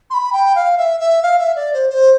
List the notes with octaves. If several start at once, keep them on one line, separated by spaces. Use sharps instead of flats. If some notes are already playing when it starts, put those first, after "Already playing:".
C6
B5
G5
F5
E5
E5
F5
E5
D5
C5
C5